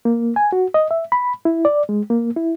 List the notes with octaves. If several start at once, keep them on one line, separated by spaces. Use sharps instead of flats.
A#3
G#5
F#4
D#5
E5
B5
E4
D5
G#3
A#3
E4